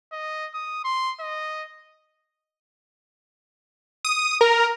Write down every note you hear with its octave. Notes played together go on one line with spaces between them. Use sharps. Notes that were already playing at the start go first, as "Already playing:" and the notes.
D#5
D#6
C6
D#5
D#6
A#4